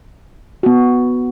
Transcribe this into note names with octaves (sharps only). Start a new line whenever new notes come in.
B3 F#4